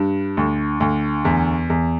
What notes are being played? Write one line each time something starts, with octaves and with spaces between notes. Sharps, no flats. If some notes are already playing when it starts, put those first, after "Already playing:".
Already playing: G2
D2
D2
E2
E2